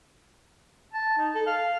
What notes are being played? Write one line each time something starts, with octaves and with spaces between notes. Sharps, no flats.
A5
D#4
A4
F5